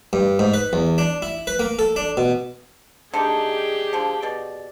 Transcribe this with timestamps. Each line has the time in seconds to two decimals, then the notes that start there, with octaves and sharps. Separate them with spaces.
0.13 G2
0.39 G#2
0.54 B4
0.73 E2
0.98 D4
1.22 E4
1.47 B4
1.59 A#3
1.79 A4
1.96 D4
2.17 B2
3.14 D3 A3 D#4 G4 G#4
3.93 D3 F3
4.22 B2 D5